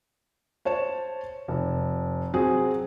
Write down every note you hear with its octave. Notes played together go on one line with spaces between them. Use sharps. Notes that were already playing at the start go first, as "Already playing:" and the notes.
C5 C#5 A5 E7
F1
F#3 C4 G#4